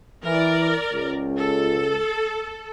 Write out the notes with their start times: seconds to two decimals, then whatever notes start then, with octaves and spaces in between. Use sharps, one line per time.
0.25 E3 A#4 D5
0.93 C#2
1.36 A4